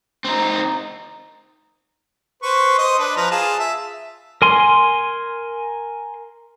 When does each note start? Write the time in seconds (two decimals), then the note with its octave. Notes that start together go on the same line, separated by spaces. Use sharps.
0.25 C4 D#4
2.43 B4 C5 C#6
2.78 C5 D#5 D#6
2.99 D4 B4
3.16 F3 B4 A#5
3.31 F4 G#4 A5
3.60 E5
4.42 A#4 G#5 C6